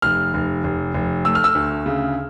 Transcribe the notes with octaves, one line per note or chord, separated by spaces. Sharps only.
F1 F6
F1
F1
F1
A3 E6
F6
E6
D2
C#3